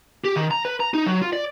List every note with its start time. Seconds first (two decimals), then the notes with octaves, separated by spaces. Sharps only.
0.25 G4
0.36 D#3
0.51 A#5
0.65 B4
0.80 A#5
0.94 D#4
1.06 F#3
1.22 F4
1.33 D5